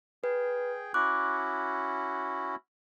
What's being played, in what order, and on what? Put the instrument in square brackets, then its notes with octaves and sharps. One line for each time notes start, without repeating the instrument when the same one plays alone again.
[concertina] G#4 G5 [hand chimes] B4
[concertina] C#4 E4 F#4 [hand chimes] D6 F#6